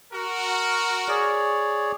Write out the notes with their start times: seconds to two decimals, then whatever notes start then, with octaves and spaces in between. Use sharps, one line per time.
0.12 F#4 A#4
1.09 G#4 C#5 D5